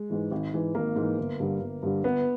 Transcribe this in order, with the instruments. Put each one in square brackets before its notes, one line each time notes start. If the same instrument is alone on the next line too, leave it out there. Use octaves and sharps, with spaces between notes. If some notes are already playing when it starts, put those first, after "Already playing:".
Already playing: [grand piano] G#3
[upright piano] G#2 E3
G#1
G#2 E3
[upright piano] G#1 [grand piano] A#3
[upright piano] G#2 E3
G1
G2 D3 G3
G1
G2 D3 G3
[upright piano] G1 [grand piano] B3